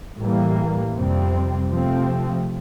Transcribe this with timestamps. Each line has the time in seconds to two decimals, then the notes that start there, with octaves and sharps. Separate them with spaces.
0.17 A2 E3 G3 A#3
0.94 F2 C3 G3 C4
1.70 C3 F3 A3 C4